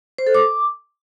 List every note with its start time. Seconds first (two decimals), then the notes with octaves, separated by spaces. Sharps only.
0.18 C5
0.26 A4
0.35 D6